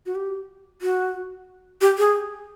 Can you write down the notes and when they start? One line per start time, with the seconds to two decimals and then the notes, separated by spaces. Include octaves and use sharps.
0.06 F#4
0.15 G4
0.82 F#4
1.81 G4
1.98 G#4